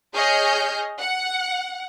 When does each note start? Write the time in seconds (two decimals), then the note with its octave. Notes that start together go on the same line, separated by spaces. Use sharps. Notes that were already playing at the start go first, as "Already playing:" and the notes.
0.12 G#4 C#5 D#5 F6 G6
0.99 F#5